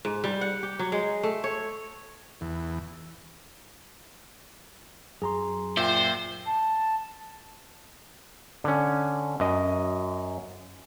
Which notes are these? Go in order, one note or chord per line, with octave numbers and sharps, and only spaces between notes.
G#2
G3
F#5
G4
F#3
G#3
A3
C#5
E2
F#2 G#4 A#5 C6
A#2 C5 E5 G5
A5
D3 C#4
F#2 D#5